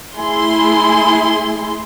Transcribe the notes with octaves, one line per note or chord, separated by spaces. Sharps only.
A3 E4 G#4 C6